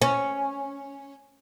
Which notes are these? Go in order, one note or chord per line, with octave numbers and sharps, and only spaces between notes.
C#4